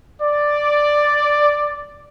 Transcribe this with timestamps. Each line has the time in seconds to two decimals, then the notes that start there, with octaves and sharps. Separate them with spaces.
0.21 D5